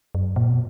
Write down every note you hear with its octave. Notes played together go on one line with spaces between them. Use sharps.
F#2
A#2
B2